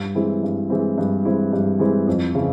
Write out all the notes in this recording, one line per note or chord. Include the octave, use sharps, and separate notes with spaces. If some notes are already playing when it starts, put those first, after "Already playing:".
Already playing: G2
E3 G#3 C4 E4
G2
E3 G#3 C4 E4
G2
E3 G#3 C4 E4
G2
E3 G#3 C4 E4
F2
C#3 E3